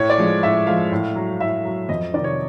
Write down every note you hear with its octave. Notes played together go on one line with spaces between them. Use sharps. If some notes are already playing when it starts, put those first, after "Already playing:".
Already playing: A2 C#5
D5
F3 G#3
A2 E5
F3 G#3 F5
A2
F#3
A2 E5
F#3
F2 D#5
C3 D#3 D5
C#5